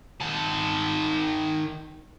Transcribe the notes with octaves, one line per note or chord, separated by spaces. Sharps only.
D#3 A5